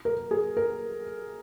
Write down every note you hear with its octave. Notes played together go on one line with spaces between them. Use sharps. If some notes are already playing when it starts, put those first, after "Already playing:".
A#4
G#4
A#4